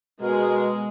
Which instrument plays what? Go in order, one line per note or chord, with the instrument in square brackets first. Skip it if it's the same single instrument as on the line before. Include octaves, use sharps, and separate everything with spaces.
[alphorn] B2 [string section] G#3 [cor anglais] A#4